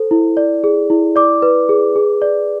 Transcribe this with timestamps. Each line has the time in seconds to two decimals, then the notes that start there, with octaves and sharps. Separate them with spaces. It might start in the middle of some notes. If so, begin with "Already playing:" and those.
Already playing: A4 C5
0.11 E4
0.37 D5
0.64 G#4
0.90 E4
1.16 D5 D6
1.42 B4
1.69 G#4
1.96 G#4
2.22 D5